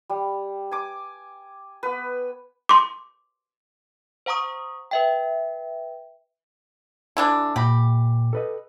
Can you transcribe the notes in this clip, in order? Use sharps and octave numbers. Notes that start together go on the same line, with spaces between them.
G3
G#5 D6
B3 B4
C6 D6
C5 F#5 A#5 C#6 D#6
B4 E5 G5
D3 E3 D4
A#2 G4 F#5 B5
A4 B4 D#5